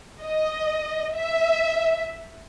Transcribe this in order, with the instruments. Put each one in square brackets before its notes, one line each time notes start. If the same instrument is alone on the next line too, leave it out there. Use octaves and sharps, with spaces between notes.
[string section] D#5
E5